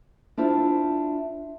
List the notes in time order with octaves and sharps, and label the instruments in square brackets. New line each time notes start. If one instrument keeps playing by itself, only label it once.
[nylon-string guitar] D4 E4 F4 C5